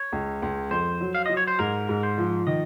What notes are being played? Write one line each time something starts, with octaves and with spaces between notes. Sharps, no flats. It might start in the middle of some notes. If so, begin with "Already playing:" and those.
Already playing: C#5
C#2
C#2
F2 C5
F#3
F5
F#3 D#5
C#5
C5
G#2 A#4
G#2
C5
F3
D#3 D#5